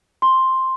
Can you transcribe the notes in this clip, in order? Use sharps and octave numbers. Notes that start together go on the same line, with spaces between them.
C6